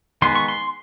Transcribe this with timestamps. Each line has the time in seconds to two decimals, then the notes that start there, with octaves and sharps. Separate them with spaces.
0.22 D#3 G#3 B3 C6
0.36 C#6
0.49 C6